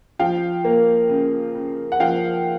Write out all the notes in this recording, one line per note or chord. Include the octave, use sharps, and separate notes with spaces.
F3 F5 G5
A#3
C#3
C#3
F#5
F3 F5 G5